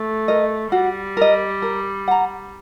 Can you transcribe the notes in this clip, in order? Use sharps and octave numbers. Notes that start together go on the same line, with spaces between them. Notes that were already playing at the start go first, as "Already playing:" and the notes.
Already playing: A3
A#4 D#5
G3 F#4
A#4 D#5
A#4
F#5 A#5